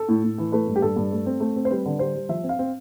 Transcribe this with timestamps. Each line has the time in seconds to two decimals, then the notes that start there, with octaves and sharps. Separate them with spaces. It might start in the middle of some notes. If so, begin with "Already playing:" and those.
Already playing: A4
0.09 A2
0.24 A2
0.38 E3
0.52 A3 B4
0.67 G2
0.76 G4
0.82 G2 A4
0.96 G2
1.12 A3
1.26 C4
1.40 A3
1.56 C4
1.65 C5
1.71 G3 B4
1.86 D3
1.99 G3 C5
2.15 G3
2.29 F3 E5
2.44 C4
2.49 F5
2.59 C4